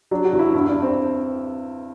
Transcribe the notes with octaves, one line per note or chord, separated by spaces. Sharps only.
F#3 D4
F#4
E2
E4
G2 E4
D4
G2
C4